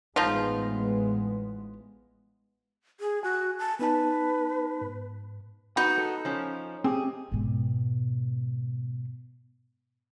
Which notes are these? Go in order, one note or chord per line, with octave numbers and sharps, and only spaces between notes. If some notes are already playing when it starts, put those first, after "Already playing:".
A1 F3 G#3 B3 D#4 F4
G#4
F#4 G#5
A5
B3 D#4 B4 A5
G#2
B3 D#4 F#4 B5
A4
F3 C#4
C4 G4 G#4
G#2 B2